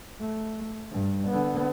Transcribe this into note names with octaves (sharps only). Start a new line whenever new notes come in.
A3
G2
D3 B3